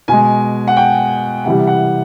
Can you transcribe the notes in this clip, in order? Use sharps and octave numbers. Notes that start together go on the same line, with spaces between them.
B2 G#3 G#5
F#5
G5
C3 E3 G3 F#5
F#5